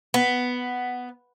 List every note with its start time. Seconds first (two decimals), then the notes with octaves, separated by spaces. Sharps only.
0.14 B3